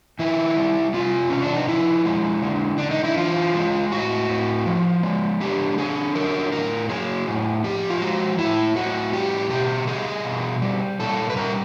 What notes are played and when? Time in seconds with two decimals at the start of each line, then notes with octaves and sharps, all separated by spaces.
0.19 D#3 E4
0.57 G3
0.94 C3 F4
1.30 C3 C#4
1.42 D4
1.55 D#4
1.68 F3 E4
2.05 G#3
2.43 D3
2.78 D3 D4
2.91 D#4
3.04 E4
3.17 E3 F4
3.54 G#3
3.92 A2 F#4
4.29 A2
4.66 F3
5.03 G#3
5.41 D3 G4
5.78 D3 G#4
6.15 F#3 A#4
6.52 A2 A#4
6.89 F#3 G#4
7.27 A2
7.64 F3 G4
7.90 F4
8.01 G#3 F#4
8.39 A2 E4
8.76 A2 F#4
9.13 G3 G4
9.50 B2 G4
9.87 G3 G#4
10.25 B2
10.62 G3
10.99 A#2 A4
11.30 B4
11.36 G3 A#4